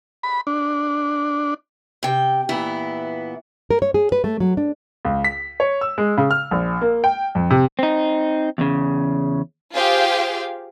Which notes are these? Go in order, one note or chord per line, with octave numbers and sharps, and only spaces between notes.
B5
D4
C3 G5
A#2 E3 B3 E4
A#4
C#5
G#4
B4
A3
F#3
D4
C#2
B6
C#5
E6
G#3
C#3
F6
A#1
A#3
G5
F2
C3
C4 D#4
E2 C#3
F4 G4 G#4 C5 F5 G5